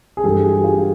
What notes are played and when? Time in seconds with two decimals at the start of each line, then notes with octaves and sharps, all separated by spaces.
0.17 G#4
0.24 G2 E3 G4 A4
0.45 F#4 G#4
0.64 F4 G4